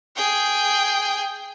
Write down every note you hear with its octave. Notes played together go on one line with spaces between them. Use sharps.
G#4 G5